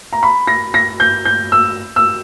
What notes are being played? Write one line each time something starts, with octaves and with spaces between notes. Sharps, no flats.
A#5
B5
A#6
A#6
G6
G6
E6
E6